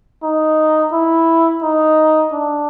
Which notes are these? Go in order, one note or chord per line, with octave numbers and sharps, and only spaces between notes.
D#4
E4
D#4
D4